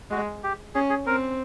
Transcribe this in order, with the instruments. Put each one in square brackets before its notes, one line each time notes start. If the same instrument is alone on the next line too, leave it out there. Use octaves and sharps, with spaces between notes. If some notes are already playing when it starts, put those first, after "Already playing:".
[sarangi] G#3 [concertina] F#4
[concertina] G4
[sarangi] C#4 [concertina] G#4
[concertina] G#4
[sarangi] C4 [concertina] A#4